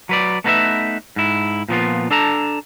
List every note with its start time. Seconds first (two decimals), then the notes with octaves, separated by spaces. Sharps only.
0.09 F#3 B4 D5
0.44 A3 B3 D#4 E4 B4 E5
1.16 G#2 E4
1.69 A#2 F3 B3 F4
2.11 D4 A4 A5 A#5